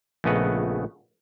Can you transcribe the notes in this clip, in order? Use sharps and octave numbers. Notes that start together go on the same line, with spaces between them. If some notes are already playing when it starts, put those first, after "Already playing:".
A#1 C#3 A3 B3 D#5 F#5